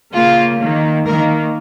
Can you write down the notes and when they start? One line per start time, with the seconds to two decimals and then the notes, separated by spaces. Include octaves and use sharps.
0.14 C#3 A#3 F4
0.60 D#3 A#3
1.05 D#3 A#3 A#4